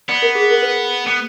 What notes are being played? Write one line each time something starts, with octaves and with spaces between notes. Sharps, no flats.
B3 D5
A#4
G#4
A#4
B4
B3